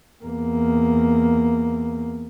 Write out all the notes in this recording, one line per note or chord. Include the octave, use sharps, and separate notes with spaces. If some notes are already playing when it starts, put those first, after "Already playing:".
E2 A#3